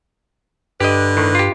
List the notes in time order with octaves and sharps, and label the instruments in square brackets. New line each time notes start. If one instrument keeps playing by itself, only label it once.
[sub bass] G2 [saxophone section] D3 B4 [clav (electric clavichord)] G4 D#5
[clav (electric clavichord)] A2 D#3
F4 G4